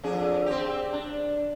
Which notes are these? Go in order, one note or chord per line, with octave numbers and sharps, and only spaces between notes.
F2 D4 G#4
C4 G4
D4